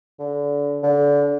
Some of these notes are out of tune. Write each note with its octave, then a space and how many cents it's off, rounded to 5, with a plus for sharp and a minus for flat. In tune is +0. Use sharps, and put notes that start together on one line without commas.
D3 -30
D3 -25